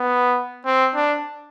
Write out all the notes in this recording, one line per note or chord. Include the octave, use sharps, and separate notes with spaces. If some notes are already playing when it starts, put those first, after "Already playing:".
Already playing: B3
C4
D4